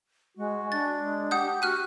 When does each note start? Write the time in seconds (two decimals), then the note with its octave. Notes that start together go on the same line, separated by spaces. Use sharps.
0.37 G#3 F#4
0.72 D4 A6
1.00 G#3
1.31 G4 F#5 D#6 G6
1.62 F#4 F6 F#6 D#7